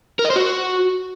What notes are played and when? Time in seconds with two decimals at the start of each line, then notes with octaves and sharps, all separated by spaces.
0.19 A#4
0.25 D#5
0.30 C5
0.36 F#4